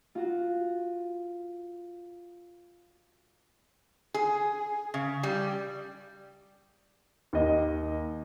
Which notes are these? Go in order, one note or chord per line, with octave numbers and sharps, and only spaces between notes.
F4 F#4
G#4
C#3
G3
D#2 D#5